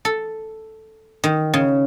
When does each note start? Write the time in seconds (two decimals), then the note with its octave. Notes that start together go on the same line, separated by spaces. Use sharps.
0.05 A4
1.24 D#3
1.54 C#3